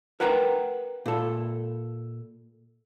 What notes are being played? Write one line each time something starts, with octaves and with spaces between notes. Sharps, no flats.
A#4 B4 F#5 G5 A#5
A#2 A4